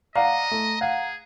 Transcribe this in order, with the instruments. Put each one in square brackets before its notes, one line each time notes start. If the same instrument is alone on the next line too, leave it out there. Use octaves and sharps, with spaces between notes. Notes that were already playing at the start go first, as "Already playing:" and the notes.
[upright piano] D5 F5 F#5 [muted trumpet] D#5 [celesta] A#5
[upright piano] A3
[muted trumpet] G#4 [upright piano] F5 F#5